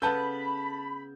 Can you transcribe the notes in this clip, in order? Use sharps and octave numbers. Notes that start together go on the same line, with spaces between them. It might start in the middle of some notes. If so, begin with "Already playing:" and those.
C#3 B3 A4 B4 F#5 A5 B5 G6